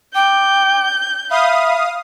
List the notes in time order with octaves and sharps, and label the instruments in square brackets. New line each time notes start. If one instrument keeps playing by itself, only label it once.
[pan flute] G5 [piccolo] D6 [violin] G6
[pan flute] E5 [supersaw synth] F5 D#6 [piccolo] B5